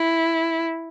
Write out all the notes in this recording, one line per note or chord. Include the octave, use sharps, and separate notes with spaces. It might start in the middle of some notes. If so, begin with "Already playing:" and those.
Already playing: E4